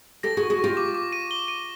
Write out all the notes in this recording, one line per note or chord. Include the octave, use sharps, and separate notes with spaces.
G4 A4 A#6
F#4 G#4 C#6
F#4 G#4
F4 G4 C#6
D6
D6
D#7
G7
D#7